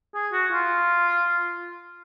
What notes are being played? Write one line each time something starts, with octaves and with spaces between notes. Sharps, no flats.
G#4
F#4
F4